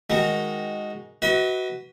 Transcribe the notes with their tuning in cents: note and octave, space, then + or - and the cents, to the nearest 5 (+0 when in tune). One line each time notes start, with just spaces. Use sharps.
D#3 +0 G#3 +0 F#4 +0
F#4 +15 B4 +0 D#5 +45